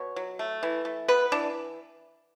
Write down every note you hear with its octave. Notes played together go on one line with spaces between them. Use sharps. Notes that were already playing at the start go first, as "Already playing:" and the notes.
Already playing: B2 C#5
F#3
A3
E3
A3
B3 B4
E3 D4